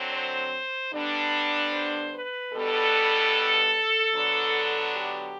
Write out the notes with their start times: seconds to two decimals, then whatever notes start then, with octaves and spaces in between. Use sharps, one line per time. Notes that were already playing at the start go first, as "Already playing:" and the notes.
Already playing: D3 F#3 C4
0.13 C5
0.93 D3 G3 B3 D4
1.74 C5
2.14 B4
2.54 B2 G3 B3 D4 A4
4.15 D3 F#3 B3 D4
4.95 G4